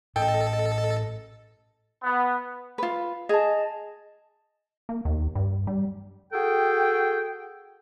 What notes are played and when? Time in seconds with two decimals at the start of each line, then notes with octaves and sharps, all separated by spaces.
0.16 A2 A3 C#4 A4 D#5 G5
2.03 B3
2.78 F4 B4
3.29 G#4 D#5 A5
4.89 A#3
5.05 D#2
5.35 G2
5.67 G3
6.33 F#4 G#4 A4 G5